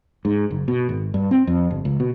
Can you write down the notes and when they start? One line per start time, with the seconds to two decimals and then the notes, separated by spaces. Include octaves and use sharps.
0.25 G#2
0.50 F#1
0.68 B2
0.89 G#1
1.14 G2
1.31 C4
1.47 F2
1.71 G1
1.85 C#2
2.00 B2